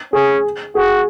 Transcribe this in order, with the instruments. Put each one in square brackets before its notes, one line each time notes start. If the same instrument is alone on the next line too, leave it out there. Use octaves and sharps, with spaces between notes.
[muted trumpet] C#4 [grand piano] G#4
[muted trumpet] F#4 [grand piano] G#4